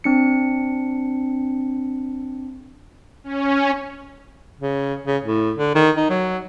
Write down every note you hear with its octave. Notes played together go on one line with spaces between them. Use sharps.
C4 D4 C#7
C#4
C#3
C#3
A2
D3
D#3
D#4
F#3